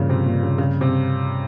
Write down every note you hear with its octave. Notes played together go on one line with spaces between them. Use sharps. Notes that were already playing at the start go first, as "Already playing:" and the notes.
Already playing: G2 A#2 C#3 F3 A#3
C3
A#2
C#3
C#3
C3